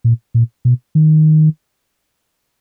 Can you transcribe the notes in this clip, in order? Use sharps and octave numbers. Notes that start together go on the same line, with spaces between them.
A#2
A#2
B2
D#3